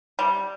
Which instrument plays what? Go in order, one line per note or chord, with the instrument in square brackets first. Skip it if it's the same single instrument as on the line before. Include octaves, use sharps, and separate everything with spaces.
[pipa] G3